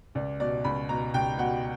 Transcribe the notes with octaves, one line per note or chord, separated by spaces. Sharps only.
C#2 D5
B2 D5
C#2 B5
B2 A#5
C#2 G5
B2 F#5